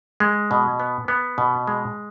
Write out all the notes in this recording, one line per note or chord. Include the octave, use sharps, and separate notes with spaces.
G#3
B2
B3
B3
B2
G#3